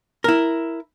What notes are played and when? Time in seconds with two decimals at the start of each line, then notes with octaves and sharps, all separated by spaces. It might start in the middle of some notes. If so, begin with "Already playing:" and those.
0.24 E4 A#4